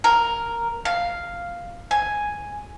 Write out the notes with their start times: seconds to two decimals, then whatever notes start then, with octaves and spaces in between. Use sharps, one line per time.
0.04 A#4
0.85 F5
1.91 G#5